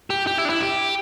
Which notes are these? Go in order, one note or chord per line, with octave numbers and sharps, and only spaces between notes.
G4
G4
E4
D4
E4
G4